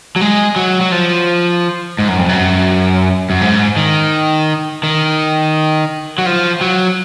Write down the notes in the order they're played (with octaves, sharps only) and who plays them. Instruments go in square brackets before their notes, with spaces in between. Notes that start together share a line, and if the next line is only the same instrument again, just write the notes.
[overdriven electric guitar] F#3
G#3
F#3
F#3
F3
G#2
F#2
F2
F#2
F#2
G#2
D#3
D#3
F#3
F3
F#3